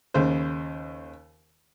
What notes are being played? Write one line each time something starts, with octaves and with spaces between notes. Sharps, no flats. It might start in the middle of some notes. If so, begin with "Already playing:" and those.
D#2 C#3 C5